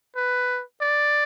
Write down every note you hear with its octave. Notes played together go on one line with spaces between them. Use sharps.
B4
D5